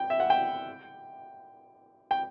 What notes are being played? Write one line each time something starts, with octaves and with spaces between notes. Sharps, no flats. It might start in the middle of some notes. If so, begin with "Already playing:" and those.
Already playing: G5
E5
F#5
G5
G5